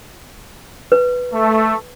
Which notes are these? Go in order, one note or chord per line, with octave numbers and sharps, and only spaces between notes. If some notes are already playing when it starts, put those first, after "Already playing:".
B4
A3